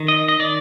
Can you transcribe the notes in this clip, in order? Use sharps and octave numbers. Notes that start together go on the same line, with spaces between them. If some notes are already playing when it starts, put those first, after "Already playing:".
Already playing: D#3
D#5
D#5
D#3 D5